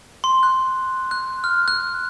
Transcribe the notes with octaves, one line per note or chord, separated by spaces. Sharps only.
C6
F#6
F#6
F6
F#6